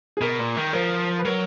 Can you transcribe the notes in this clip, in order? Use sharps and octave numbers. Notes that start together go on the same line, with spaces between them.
G#4
B2 A#4
A#2
D#3
F3 A#4
B4
F#3 A#4